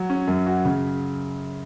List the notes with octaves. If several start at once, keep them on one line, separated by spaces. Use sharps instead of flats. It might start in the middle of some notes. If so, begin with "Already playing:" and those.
Already playing: F#3
C#4
F#2
F#4
C#3